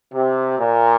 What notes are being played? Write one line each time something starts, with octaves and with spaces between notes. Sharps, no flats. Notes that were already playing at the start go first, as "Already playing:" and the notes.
C3
A#2